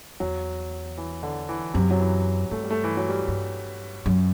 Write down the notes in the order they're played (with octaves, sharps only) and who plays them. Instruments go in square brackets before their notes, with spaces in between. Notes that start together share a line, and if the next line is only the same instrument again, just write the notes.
[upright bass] E2 [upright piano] F#3
[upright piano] E3
D3
E3
[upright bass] F#2 [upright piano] C3
[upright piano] F#3
E3
[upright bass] G2 [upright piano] A3
[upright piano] G3
A3
E3
F#3
G3
[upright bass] G2
F#2